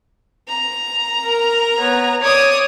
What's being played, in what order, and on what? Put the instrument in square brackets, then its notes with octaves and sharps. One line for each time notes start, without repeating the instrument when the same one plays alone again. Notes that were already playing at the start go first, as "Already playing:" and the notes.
[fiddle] A#5
[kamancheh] A#4
B3 C#5
[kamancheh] C#5 [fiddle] D5 D#6